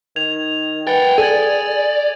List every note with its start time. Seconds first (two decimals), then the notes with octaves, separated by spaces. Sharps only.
0.16 D#3 G#6 F7
0.87 B4 F#5 G5 A6
1.18 G#4 A4 D5 G#6 D#7